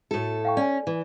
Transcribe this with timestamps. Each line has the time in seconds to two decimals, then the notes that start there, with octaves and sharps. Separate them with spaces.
0.11 A2 F#4 A4
0.45 F5 G5 C#6
0.57 C#4 D5 G#5
0.87 E3